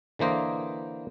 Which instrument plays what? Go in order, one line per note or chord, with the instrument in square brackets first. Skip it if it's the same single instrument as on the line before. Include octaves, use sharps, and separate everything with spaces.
[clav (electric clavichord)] D3 E3 A#3 C5 D#5